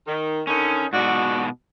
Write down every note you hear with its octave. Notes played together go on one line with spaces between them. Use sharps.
D#3
D3 D#3 C#4 D#4
G#2 B2 F#4 D5